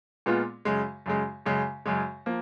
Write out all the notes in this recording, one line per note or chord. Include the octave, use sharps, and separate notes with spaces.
A#2 G#3 B3 F4
F#2 C#3 G#3
F#2 C#3 G#3
F#2 C#3 G#3
F#2 C#3 G#3
F3 A#3